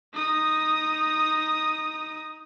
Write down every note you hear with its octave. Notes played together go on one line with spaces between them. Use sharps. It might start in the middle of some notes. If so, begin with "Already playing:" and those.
D#4 D#6